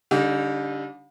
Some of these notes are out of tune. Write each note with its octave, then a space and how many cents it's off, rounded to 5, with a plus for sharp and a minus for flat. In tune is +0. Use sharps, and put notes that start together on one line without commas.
D3 -35 G3 +0 D#4 -20